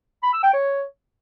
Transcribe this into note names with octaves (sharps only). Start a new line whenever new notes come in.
B5
E6
G5
C#5